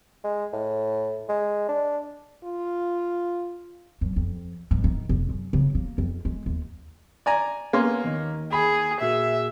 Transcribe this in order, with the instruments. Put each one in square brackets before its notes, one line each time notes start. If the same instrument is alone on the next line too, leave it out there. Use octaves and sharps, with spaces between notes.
[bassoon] G#3
A2
G#3
D4
[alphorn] F4
[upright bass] F#2
F2
G#2
D#3
F1
F#2
C#3
A#3
F2
G#3
D#2
[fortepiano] D5 G#5 A#5
[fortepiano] A#3 C#4 C6 [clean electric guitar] B3
[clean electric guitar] D#2 D#3
[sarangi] G#4 [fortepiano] B5
[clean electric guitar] A#2 F#4 G#4 [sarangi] E5